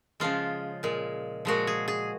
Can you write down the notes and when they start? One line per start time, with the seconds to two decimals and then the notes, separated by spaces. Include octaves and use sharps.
0.20 C#3 F3 G#3 F4
0.83 A#2 G#3
1.45 A#2 F3 G#3 F#4
1.67 G#4
1.88 G#4